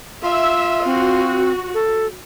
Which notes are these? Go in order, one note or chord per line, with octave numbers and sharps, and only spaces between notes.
F4 E5
C4 F#4
A4